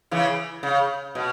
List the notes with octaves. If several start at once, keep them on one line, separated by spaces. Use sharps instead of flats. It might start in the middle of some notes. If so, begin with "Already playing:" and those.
C#3 E3
C#3
B2